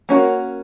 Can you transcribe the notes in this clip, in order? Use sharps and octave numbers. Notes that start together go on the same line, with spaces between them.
A#3 C#4 F#4 A#4